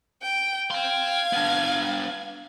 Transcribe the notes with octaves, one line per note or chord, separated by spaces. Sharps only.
G5
F5 G5 C6 G#6
B3 D4